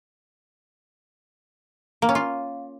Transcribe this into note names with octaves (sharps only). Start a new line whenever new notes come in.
A#3
C#4
F4